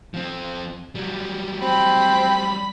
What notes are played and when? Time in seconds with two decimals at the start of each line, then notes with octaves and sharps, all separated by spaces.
0.14 F3 C4
0.95 F#3 G3
1.62 C4 B5 B6